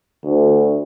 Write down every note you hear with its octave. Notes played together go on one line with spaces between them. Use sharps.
D2